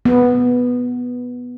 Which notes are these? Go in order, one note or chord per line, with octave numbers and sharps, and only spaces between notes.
B3